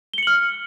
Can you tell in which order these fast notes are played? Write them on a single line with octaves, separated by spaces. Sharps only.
G7 C#7 F#7 F6